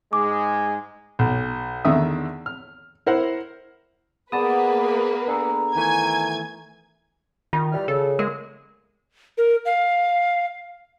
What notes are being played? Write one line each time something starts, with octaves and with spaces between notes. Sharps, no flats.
G#2 G#3 D6
B1
E2 D3 D#3 E5 D#6
F6
E4 A#4 C5 F#5
A#3 B3 G#4 B4 D5 A5 D#6
D4 G#4 A4 A#5
D#3 E3 A3 G#5 G#6
D#3 F4
E3 G3 F6
C#3 A4
G#3 A#4
A#4
F5